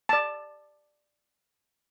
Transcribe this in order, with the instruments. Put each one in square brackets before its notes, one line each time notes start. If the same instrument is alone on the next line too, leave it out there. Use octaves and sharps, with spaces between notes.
[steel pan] D5 A5